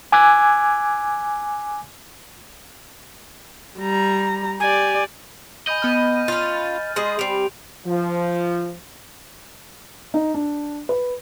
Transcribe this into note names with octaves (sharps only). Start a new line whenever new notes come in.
G#5 D6 E6 F#6 G#6
G3 A#5
G4 D5 G#5
D#5 G#5 B5 G6
B3 B5 F6 G6 D#7
C#4 F4 B5 F6 A6
G#3 G#4 D#5 C6
G3 C4 D7 F7
F3
D#4
D4
B4